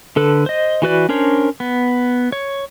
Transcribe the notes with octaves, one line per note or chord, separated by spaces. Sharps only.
D3 A4 B4
C5 D#5
E3 F#4 B4 D5
C#4 D4 A#4 C5 C#5
B3
C#5